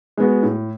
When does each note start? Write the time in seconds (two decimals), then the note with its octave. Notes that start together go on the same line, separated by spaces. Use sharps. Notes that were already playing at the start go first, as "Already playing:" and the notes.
0.17 G#3 B3 F#4
0.43 A2